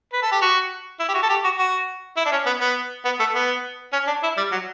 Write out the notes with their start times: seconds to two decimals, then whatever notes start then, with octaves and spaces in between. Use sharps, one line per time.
0.13 B4
0.22 A4
0.32 G4
0.42 F#4
1.00 E4
1.08 G4
1.14 F#4
1.23 A4
1.29 G4
1.44 F#4
1.58 F#4
2.17 E4
2.25 D4
2.32 C#4
2.46 B3
2.61 B3
3.05 B3
3.19 A3
3.35 B3
3.93 C#4
4.07 D4
4.23 E4
4.37 G3
4.52 F#3